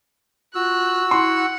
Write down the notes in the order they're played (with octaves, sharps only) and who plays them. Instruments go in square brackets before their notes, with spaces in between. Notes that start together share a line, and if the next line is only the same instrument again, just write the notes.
[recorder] F4 [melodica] F#4 E6 [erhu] F#6
[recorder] E4 [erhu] F#5 [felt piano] C6